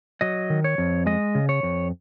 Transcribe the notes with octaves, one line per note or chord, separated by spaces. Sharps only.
F#3 D#5
D#3
C#5
F2
G#3 D#5
C#3
C#5
F2